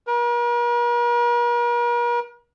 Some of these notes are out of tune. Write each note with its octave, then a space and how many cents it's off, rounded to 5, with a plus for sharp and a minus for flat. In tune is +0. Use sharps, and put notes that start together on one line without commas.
A#4 +45